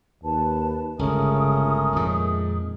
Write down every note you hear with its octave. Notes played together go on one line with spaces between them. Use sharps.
D#2 B4 A5
G1 C#2 C#3 A3 C#4 A#4 D#6
F2 A#2 D#3 G#3